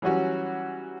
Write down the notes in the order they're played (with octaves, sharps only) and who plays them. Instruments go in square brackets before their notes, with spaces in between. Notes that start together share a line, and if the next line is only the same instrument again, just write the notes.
[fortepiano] E3 F#3 G3 C#4 F#4